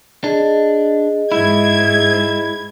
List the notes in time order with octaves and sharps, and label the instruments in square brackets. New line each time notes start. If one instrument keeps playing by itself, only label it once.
[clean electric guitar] D4 [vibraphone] G#4 D#5
[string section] G#2 G#6 [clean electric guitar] E4